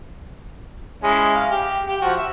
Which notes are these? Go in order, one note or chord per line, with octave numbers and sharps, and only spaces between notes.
G#3 C#4 E4
F5
G4
G4
F3 F#4
E5